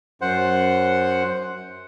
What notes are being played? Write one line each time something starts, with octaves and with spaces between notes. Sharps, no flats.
F#2 C5 F#5